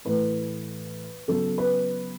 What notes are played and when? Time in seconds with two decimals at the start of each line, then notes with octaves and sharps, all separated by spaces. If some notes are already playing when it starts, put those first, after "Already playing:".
0.05 A2 E3 A3 B4
1.27 C#3 F#3 B3 A4
1.58 B4